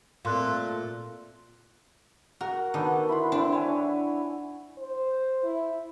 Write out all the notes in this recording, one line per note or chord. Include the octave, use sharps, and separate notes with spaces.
A#2 A3 C4 A4 F5 C6 F#6
F#4 A#4 F#5
D#3 B3 D4 A4
E4 B5 C6
C4 D4 E4
C#5 G#5
C5
E4